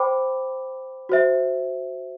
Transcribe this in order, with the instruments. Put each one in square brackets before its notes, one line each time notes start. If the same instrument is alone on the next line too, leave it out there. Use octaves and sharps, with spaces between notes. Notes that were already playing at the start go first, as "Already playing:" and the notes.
Already playing: [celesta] C5 G5 B5 D6
F#4 C5 E5